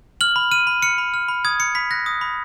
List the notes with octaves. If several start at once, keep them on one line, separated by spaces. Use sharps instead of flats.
F6 F#7
B5
F6 D#7
B5
F6 C#7
B5
F6
B5
D#6 G#6
B5 C#7
B5 B6
F#6 A#6
D#6
B5